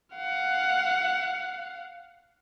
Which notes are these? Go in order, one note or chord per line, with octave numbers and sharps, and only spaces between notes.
F5 F#5